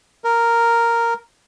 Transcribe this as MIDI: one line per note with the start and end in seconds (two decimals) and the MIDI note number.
0.24 1.14 70